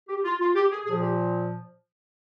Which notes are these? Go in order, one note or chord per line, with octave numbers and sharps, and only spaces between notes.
G4
F4
F4
G4
G#4
A#2 F3 G#4
G4